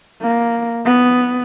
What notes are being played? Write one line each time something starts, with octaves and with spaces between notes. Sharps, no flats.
A#3
B3